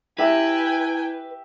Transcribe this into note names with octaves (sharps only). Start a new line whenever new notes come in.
E4 G4 B4 E5 G5 G#5